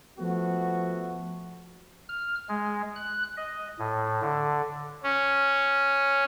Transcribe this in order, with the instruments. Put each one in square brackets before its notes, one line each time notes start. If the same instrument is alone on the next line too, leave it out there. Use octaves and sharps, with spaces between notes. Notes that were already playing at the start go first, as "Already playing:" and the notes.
[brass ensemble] F3 A3 B3 F#4
[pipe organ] F6
G#3
F#6
D#5
A2
D3
C#4